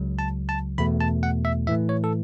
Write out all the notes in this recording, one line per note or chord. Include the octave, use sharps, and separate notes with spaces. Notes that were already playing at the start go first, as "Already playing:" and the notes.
Already playing: C#2 C#3 F#3
A5
A5
E2 B2 A3 B5
A5
F#5
E5
A2 E3 A3 E5
C#5
A4